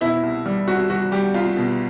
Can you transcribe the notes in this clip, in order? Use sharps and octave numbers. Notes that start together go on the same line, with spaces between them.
B2 E4
C2
G3
C2 F#4
G3 F#4
G3 G4
C2 F4
B2